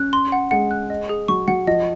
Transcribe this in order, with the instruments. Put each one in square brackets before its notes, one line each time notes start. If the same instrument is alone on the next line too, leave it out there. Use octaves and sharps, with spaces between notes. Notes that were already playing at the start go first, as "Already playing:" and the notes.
Already playing: [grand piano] C#4 [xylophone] F#6
[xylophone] C6
F#5
[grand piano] G#3 [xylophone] F#5
[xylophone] F#6
D#5
G#4
[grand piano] F#3 [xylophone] C#6
[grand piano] F#3 [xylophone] F#5
[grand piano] F3 [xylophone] D#5